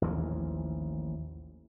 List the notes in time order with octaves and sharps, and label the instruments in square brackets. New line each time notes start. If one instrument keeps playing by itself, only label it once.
[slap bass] A1 D#2 E3 F3